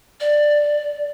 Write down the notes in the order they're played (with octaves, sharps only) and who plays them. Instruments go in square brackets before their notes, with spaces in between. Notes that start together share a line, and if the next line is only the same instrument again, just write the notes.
[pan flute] D5